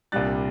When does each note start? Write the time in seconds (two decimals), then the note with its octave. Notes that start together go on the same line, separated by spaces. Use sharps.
0.12 C2 A#2 G3 D4 F#6 A6